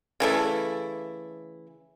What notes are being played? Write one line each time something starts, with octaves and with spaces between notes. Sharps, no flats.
C#3 E3 A3 E4